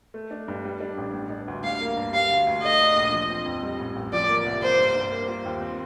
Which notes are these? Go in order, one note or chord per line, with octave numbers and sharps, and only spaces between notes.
A3
D4
G2
G3
D4
A1
G3
D4
D2
G3 F5
A#3
G2
G3 F5
D2
D2
A3 D#5
D4
A#1
F3
C4
F2
G3
A1
A1
F3 D5
A#3
C2
A#3 C5
G2
G2
A#3
F4
D#2
C4